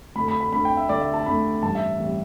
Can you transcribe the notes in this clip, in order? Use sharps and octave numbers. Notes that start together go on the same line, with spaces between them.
D2 D3 A3 B5
B5
B5
D2 D3 A3 B5
G5
E5
D2 D3 A3 D5
E5
A5
D2 D3 A3 B5
A1 G2 G3 A5
E5
A1 G3